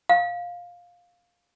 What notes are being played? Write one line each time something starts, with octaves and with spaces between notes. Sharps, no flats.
F5